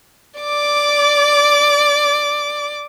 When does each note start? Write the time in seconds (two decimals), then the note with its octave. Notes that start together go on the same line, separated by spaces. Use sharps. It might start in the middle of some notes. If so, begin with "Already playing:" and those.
0.40 D5 D6